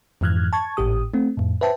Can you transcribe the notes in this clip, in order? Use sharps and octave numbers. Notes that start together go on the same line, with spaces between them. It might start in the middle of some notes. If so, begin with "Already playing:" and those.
F2 G#2 E3 F6 F#6 G#6
A5 C#6 G#6
G#1 A2 G4 D#6
A3 C4
F2 A2
B4 C5 E5 G5 A5